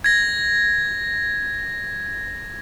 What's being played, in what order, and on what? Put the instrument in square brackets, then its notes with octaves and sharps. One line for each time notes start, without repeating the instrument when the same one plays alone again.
[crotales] G#6 A#6